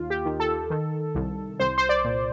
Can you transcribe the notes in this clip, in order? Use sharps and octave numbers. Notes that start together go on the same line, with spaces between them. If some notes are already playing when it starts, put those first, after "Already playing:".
Already playing: D#2 F4
G4
D#3
A4
D#3
C2
C2 C5
C5
D5
A#2